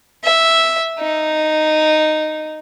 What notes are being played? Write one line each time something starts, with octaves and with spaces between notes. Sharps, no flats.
E5
D#4